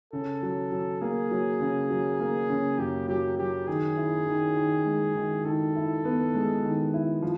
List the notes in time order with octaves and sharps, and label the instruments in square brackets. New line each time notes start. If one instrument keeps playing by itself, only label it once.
[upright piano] C#3 [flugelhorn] A4
[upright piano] F#3
F#3
[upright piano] A#3 [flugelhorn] G#4
[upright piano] F#3
C#3
F#3
A#3
C#3
[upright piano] F#2 [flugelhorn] G4
[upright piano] F#3 [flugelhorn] G4
[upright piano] F#3 [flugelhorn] G4
[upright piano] D#3 [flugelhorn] G#4
[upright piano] E4
D#3
D#3
G#3
D#3
[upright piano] D#3 [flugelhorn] A4
[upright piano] E4
B3
G#3
D#3
E4
F3